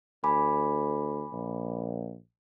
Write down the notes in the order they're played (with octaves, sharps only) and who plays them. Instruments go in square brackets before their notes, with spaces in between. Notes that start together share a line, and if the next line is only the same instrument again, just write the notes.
[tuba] D2 [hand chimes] G#5 B5 D6
[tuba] A#1